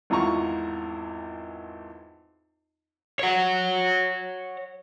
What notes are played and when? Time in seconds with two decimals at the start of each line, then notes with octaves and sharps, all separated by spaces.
0.10 G#1 E2 F4 F#5 A#5 C#6
3.19 C#5 F#5